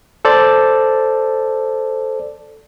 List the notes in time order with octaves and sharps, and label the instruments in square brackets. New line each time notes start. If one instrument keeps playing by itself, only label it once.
[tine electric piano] A4 C5 D5